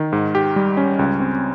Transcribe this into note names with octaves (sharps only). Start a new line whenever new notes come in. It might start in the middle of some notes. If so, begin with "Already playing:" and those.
Already playing: D#3
G#2
G4
G3
C#4
C#2
C4